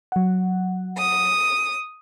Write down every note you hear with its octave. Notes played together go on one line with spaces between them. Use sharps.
F#3 F#5
D#6